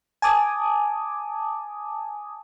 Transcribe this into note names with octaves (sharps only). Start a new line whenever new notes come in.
G#5 A5 D6 D#6